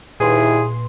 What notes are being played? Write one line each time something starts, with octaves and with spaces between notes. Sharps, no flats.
D#2 A#2 D#3 E4 G#4 B4 C6